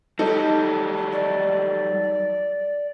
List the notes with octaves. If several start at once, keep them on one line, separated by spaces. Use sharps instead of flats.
F#3 G3 D#4 A4
D5